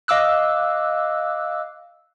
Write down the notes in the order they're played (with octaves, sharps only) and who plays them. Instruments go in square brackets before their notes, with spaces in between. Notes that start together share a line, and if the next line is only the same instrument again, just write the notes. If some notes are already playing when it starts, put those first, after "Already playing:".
[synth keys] D#5 F5 D6 E6 F#6